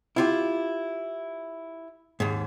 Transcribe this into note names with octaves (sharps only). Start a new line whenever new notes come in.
E4 F4 G4
D#2 G#2